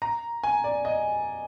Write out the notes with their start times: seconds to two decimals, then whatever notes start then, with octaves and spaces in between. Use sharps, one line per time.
0.02 A#5
0.43 G#5
0.64 D5
0.85 D#5